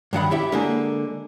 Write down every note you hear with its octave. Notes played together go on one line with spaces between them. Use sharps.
G2 D#3 F#5 B5
E4 G4 E5
D3 G#3 A#3